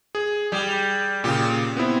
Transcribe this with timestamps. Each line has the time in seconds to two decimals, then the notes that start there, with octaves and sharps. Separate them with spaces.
0.15 G#4
0.52 G3 G4 G#4 G5
1.24 A#2 C#3 G4
1.77 B3 C4 E4